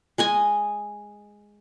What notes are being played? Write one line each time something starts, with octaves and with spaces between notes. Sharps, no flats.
G#3 D#5 G#5